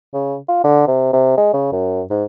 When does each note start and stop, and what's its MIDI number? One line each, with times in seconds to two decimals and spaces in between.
0.13 0.36 49
0.49 0.62 65
0.64 0.84 50
0.87 1.09 48
1.13 1.37 48
1.37 1.50 56
1.53 1.70 49
1.72 2.02 42
2.10 2.24 44